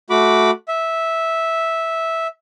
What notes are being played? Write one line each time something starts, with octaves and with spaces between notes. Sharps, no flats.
A3 F#4 B5 D6
E5